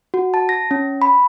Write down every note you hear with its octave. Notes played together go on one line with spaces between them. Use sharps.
F#4
A5
A#6
C#4
B5